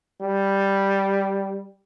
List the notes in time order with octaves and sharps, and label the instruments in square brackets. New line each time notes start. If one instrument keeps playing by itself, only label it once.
[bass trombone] G3